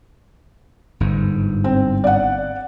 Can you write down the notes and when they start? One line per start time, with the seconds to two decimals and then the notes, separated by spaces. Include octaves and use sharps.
1.00 G1 G#2
1.64 C4
2.04 D5 F#5